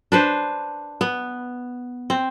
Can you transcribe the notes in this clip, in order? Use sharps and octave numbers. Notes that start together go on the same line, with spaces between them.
D4 B4 C5
B3
C4